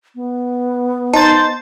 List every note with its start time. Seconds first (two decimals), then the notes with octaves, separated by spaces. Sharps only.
0.15 B3
1.13 D#4 C5 A5 A6